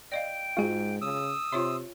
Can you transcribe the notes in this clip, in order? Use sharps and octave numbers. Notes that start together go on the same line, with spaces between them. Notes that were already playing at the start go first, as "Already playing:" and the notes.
D5 D#5 F5 G5
G#2 G#3 F4 F#4 G#4
C#3 D#6 E6
C3 F4 C#5 E5 C6